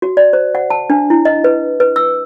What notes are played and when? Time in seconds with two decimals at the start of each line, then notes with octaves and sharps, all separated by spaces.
0.02 F#4
0.17 D5
0.33 C5
0.55 F#5
0.70 A5
0.90 D4
1.10 E4
1.25 D#5
1.44 B4
1.80 B4
1.96 E6